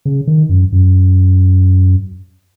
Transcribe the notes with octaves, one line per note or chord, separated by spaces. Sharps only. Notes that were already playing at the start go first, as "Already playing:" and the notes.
C#3
D#3
F#2
F#2